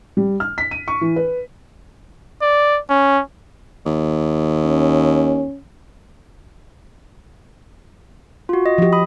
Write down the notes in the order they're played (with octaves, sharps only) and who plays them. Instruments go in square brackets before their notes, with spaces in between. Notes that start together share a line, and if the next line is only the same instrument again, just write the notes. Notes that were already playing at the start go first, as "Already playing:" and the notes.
[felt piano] G3
F6
B6
D#7
C#6
E3
B4
[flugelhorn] D5
C#4
[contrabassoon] D#2
[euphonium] C#4
[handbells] F4 F#4
D#5
[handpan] F3 G4
[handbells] B5 D#6